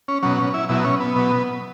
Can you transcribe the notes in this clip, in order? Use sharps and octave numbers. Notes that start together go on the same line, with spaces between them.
C#4
B2 F#3 C#4
C#4
E4
B2 F#3 E4
C#4
B3
B2 F#3